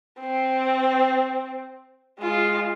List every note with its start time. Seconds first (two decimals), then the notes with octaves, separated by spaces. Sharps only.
0.20 C4
2.20 G#3 F4